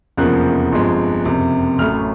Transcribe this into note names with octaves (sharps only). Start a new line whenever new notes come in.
F1 E2 C#3 F3 A#3 F#6
G1 F2 C3 F3 G#3
F#1 F2 C3
A1 A2 F#3 A3 F6